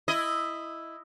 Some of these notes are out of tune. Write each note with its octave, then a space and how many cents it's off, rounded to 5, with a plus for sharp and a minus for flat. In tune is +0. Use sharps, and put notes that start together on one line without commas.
E4 +5 D#5 +0